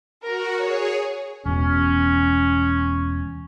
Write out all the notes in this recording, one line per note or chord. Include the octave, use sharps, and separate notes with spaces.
F#4 A#4
G#4 C#5
E1 B2 C#4